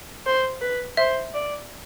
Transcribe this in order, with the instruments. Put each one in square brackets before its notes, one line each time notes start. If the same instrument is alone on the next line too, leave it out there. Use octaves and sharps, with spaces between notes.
[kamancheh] C5
B4
[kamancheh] C5 [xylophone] E5
[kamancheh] D5